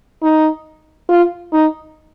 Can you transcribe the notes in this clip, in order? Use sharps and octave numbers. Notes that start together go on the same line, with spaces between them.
D#4
F4
D#4